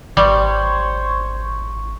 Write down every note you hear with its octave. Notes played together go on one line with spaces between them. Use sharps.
G#1 G3 C5 C#5 C#6